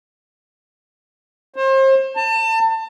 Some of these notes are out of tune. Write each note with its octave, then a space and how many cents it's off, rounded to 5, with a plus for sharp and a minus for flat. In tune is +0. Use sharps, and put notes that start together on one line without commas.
C5 +35
A5 +30